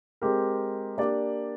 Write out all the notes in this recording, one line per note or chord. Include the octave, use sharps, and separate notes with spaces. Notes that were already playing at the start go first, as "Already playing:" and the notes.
G#3 C4 G4 A#4
A#3 D4 G4 D5